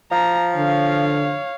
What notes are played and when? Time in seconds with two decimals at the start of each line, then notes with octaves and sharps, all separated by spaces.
0.11 F3 A#5
0.56 D3 C#5 F5